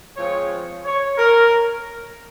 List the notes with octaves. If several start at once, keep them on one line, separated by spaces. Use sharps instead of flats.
F3 G#3 C4 F4 C#5
C#5
A#4